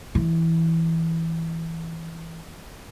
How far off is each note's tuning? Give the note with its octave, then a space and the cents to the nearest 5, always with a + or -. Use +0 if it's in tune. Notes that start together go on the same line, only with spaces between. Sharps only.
E3 -5